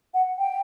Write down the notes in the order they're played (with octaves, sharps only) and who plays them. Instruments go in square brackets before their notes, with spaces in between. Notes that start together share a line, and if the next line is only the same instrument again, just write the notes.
[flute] F#5
G5